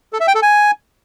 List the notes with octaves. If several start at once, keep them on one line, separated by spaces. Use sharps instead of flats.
A4
E5
G5
A4
G#5